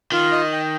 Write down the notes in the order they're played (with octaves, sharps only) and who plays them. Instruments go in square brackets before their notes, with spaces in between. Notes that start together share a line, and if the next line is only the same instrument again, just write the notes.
[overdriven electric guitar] D#3 [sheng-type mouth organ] F4
[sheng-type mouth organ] D#5
G5